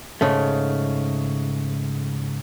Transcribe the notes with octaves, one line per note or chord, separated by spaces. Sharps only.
G#2 C#3 A3